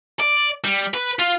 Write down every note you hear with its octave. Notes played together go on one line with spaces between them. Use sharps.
D5
G3
B4
F4